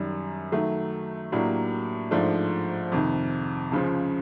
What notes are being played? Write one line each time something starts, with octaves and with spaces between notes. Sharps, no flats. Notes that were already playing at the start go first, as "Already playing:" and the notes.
Already playing: F#2 D#3 G3
D#3 F#3 A3
A2 F#3 A#3 D4 G4
G#2 F3 A3 D4
F2 C3 D#3
C#2 C#3 F3